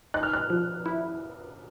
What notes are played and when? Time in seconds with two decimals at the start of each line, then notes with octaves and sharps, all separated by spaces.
0.14 D#4 F#6
0.23 F6
0.33 F#6
0.50 F3
0.86 E4